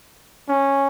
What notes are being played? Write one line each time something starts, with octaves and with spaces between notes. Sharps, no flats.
C#4